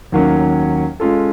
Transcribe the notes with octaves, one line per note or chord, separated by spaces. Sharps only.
D#2 D#3 F#3 A#3 C#4
G#3 C#4 F4 A4